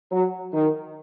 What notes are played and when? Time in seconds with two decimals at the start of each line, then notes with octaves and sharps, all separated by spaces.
0.12 F#3
0.54 D#3